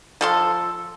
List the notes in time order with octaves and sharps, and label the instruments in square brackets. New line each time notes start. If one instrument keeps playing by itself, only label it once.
[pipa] F3 A4 C6